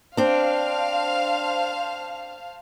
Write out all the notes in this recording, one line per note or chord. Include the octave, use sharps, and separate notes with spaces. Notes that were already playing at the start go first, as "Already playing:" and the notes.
C4 D4 C5 F5 A5